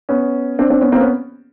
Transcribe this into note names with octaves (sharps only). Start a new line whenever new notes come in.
B3 C#4
C4 D4
C4 D4
B3 C#4
A#3 C4
B3 C#4